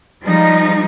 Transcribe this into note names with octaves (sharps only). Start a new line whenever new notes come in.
F3 G3 G#3 D#4